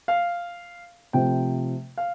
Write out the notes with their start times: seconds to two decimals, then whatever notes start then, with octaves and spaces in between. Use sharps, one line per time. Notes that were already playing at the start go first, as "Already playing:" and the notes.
0.08 F5
1.13 C3 F3 A3 G5
1.98 F5